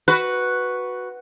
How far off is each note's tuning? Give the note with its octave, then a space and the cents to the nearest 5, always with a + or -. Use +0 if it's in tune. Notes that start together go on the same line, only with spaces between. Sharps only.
F#4 +0 B4 +0